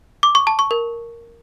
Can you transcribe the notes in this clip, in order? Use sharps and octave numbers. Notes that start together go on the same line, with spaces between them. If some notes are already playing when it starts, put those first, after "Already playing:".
D6
C#6
A5
C#6
A#4